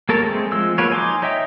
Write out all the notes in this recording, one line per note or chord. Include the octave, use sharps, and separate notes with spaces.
A#3 A4 A#4 C#5 A5
G#3 A3 C4
F3 G#3 E6
F3 F#3 A#3 B4 C#5
D#4 G#5 C6 D6
D#4 C#5 D#5 E5 G5